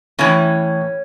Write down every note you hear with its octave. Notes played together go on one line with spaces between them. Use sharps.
A2 E3 C#4